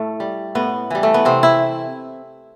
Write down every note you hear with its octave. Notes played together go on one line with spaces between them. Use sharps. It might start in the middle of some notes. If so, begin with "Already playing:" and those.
Already playing: A2 A3
G3
A2 B3
E3 G3
A3
B3
C3 C4
E4